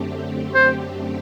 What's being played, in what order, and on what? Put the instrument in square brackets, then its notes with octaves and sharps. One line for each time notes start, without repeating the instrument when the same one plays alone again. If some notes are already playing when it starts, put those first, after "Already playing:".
Already playing: [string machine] F#2 D3 A3 C4 G4
[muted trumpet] C5